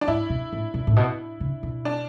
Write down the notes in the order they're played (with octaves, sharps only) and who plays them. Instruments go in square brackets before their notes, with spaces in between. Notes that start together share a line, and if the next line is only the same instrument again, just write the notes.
[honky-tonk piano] D4
[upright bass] G#2 [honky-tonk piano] E4
[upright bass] B2
A2
B2
A2
B2
C#3
B2
[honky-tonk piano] D4